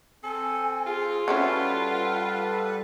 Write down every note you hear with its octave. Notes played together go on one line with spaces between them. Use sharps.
C4 A4 G#5
F4 G#4
G3 C#4 E4 F#4 A4 B4 F#5